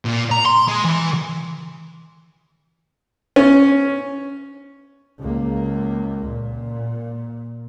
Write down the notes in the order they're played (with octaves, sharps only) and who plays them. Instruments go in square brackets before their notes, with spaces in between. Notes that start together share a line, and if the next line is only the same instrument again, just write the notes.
[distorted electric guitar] A#2
A#5
C6
G#3
E3
[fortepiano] C#4
[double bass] C#2 A#3
A#2